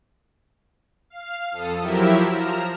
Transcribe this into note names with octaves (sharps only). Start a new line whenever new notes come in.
F5
F2 A4 D#6
F3 F#3 E4 G4 A#4 E5
F3 A#5 F6 E7